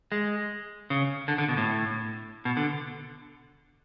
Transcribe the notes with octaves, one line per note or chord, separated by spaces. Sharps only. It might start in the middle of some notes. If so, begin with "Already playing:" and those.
G#3
C#3
D3
D3
B2
A2
B2
D3